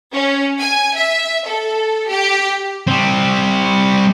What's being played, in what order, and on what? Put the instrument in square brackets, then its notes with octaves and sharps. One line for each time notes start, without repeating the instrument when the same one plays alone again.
[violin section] C#4
G#5
E5
A4
G4
[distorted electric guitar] G3 C4